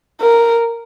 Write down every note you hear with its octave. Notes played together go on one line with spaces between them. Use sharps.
A#4